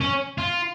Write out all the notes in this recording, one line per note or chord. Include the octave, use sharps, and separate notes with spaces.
C#4
F4